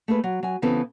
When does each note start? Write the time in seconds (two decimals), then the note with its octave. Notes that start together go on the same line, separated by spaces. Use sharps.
0.08 A3 A#3 G#4 B4
0.24 F#3
0.43 F#3 G#5
0.62 C#3 E3 B3 C4 G4 A4